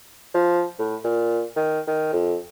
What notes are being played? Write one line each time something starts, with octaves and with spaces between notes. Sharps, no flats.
F3
A2
A#2
D#3
D#3
F2